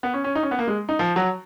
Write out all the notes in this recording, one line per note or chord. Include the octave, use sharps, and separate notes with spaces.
B3
C#4
C#4
D#4
C#4
B3
A#3
G#3
D#4
F3
F#3